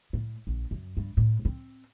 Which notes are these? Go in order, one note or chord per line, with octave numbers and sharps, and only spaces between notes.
A2
A#1
F#2
G2
A2
C4